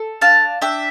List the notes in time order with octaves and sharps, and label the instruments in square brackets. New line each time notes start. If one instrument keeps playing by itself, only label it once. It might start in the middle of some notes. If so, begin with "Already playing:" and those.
Already playing: [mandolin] A4
D4 F5 A5
D4 E5 G5